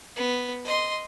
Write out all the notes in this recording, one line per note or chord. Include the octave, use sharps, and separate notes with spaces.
B3
D#5 C6